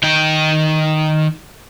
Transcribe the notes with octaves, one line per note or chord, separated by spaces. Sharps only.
D#3 G5